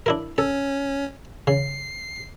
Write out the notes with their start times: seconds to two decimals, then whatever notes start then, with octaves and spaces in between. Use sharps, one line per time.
0.06 D4 E4 A#4
0.38 C#4 A4
1.47 C#3 C7